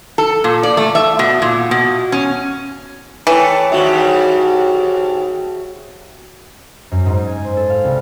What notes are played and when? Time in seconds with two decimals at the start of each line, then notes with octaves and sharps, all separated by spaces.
0.18 A4
0.44 A#2
0.63 D5
0.77 A3
0.95 E5
1.19 B2
1.42 A#2
1.71 B2
2.12 C#4
3.27 E3 A3 C#5 G5 A5
3.72 D#2 G#2 G3 F#4 E5
6.92 F#2
7.06 G#2
7.27 G#5
7.45 C5
7.57 A4
7.70 F5
7.84 C2